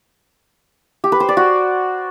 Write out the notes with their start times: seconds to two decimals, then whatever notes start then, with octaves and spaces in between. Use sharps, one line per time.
1.04 G4
1.12 B4
1.20 C5
1.29 D5
1.37 F#4